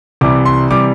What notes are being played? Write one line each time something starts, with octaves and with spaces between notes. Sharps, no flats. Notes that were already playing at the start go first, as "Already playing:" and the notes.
C2 C3 E3 G3 D6
C6
C3 E3 G3 D6